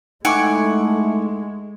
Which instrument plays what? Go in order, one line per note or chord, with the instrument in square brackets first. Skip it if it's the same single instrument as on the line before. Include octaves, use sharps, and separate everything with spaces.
[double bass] G#3 [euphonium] A3 [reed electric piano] D#4 C#6 D6 [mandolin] E4 F#5 G#5